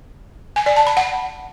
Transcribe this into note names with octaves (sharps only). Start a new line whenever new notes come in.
G#5
D5
A5
B5
F#5